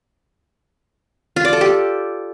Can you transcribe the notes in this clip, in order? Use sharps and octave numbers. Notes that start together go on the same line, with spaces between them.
F4
D5
A4
G4